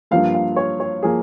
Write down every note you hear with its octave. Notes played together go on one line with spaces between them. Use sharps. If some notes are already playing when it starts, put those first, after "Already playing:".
G2 F3 A#3 F5
F5
C#5
C#5
F3 A#3 G#4